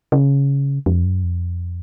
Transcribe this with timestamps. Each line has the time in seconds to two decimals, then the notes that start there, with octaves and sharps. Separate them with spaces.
0.12 C#3
0.86 F2
1.05 F#2
1.23 F2